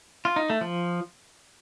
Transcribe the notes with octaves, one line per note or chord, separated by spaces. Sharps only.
F4
D#4
A3
F3